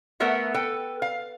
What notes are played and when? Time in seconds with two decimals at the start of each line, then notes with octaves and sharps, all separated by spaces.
0.20 A3 B3 A4 A#4 E5 F#5
0.54 A4 B4 G5
1.02 F5